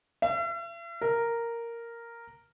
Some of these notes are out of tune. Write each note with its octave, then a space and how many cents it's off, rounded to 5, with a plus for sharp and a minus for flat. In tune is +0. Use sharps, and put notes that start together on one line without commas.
E5 +45
A#4 -5